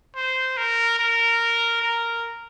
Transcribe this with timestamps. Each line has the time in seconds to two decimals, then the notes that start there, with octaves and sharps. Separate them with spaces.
0.16 C5
0.57 A#4
0.99 A#4
1.82 A#4